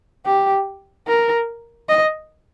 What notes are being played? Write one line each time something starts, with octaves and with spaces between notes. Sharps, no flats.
G4
A#4
D#5